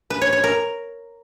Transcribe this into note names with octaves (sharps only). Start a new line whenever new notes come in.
B4
C#5
C#5
A#4